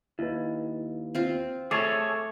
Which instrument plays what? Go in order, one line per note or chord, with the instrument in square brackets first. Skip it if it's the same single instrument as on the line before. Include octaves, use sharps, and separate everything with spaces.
[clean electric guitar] D#2 [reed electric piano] E4 B4
[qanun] C4 F4
[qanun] A3 [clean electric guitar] G#4 A4 C#5 [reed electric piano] D6 A6